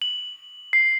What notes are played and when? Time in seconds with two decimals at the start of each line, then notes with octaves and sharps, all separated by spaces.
0.02 F#7
0.73 C7